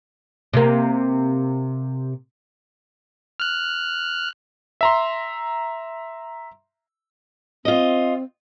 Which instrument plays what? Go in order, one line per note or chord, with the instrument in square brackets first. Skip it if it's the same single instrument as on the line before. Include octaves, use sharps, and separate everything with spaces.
[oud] C3 A#3
[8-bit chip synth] F6 F#6
[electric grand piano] E5 A#5 C6
[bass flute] C4 [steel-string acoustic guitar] F4 D#5